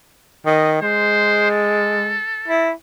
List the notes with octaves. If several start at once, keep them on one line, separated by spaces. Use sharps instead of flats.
D#3 D#5
G#3 C5
A4
E4